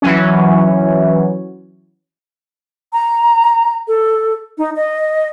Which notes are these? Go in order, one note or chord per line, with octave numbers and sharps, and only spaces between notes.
E3 F#3 C#4
A#5
A4
D#4
D#5